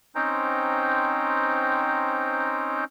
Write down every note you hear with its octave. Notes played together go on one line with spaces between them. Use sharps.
C4 C#4 D#4 C5 G5 A#5